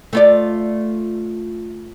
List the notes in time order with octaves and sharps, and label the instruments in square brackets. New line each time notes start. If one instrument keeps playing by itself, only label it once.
[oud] A3 F4 D5